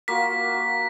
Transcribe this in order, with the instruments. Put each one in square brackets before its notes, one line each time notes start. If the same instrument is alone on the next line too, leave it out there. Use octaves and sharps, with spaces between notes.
[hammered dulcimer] A#3 F4 F#4 [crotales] B6
[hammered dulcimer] F#4